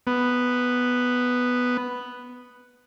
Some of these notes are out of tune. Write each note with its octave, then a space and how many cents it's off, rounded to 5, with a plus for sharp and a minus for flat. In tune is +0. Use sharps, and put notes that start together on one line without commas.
B3 +0